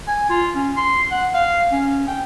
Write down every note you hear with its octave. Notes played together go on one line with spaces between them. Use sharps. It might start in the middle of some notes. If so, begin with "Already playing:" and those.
G#5
F4
C#4
C6
F#5
F5
C#4
G5